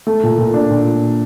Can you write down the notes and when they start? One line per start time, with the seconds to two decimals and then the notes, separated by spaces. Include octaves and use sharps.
0.07 A3
0.23 A#2
0.38 A#2
0.54 D4
0.70 A#2